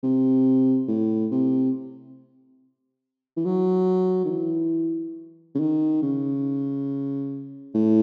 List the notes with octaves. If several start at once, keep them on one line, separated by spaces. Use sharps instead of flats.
C3
A2
C3
E3
F#3
D#3
E3
C#3
D#3
C#3
A2